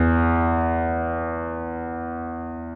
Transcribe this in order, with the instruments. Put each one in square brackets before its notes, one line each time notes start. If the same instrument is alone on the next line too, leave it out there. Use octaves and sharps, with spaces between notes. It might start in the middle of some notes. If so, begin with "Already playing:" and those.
Already playing: [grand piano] E2